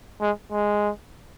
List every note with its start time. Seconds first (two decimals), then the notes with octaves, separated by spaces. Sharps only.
0.21 G#3
0.52 G#3